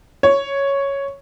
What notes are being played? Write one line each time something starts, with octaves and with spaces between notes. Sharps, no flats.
C#5